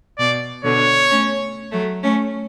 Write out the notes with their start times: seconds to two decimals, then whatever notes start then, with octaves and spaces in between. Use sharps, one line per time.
0.18 B2 D5
0.64 B2 D3 C#5
1.10 A3 C#4
1.72 F#3 A3
2.03 A3 C#4